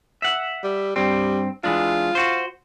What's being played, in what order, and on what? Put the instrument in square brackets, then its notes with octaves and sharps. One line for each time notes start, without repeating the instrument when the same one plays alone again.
[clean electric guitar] E5 F#5
[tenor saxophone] G3
[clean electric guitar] G2 C4 [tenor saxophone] G3
[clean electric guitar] E3 G#3 D4 [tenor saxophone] F4
[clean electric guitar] F#4 C5